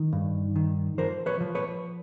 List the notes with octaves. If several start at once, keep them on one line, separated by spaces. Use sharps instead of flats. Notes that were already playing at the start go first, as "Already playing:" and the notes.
Already playing: D#3
G2
D#3
F3 A#4 C5
B4 C#5
F3
B4 C#5